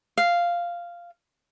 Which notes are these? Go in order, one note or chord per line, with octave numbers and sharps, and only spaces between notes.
F5